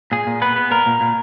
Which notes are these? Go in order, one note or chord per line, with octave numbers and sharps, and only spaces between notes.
A#2 G#4
A#2
B3 B4
B3
A#2 A#4
A#2
A#2